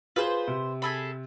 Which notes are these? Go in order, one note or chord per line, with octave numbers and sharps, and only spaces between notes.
F4 G#4 B4 C5
C3
G#4 A4 B5